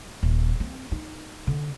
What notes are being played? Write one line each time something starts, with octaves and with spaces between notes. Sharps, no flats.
D#1
C4
D#4
D3